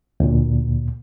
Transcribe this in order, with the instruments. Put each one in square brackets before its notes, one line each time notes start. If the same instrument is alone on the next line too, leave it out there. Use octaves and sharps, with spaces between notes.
[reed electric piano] D2 A#2